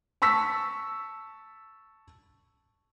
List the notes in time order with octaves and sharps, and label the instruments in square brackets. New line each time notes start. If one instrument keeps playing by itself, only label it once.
[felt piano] A5 C#6 E6 B6